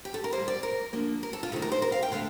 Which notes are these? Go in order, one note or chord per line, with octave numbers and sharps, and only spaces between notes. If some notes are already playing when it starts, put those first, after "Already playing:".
G4
A4
A#4
C3 G3 A#3 C5
D5
A#4
D3 F3 A#3
A#4
A4
F4
C3 D#3 A3 A4
A#4
C5
A#4
F5
G5
D3 A3 F5